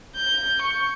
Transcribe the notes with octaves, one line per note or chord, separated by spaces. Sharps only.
G6
C#6